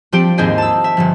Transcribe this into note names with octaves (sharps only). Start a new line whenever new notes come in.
F3 C4 D4 G4 G5 D7
D#2 G#2 C4 G#4 C5 D#5
A5 E6
E5
G1 G2 F3